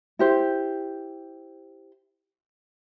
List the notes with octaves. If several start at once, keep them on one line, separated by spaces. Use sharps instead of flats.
E4 G4 C5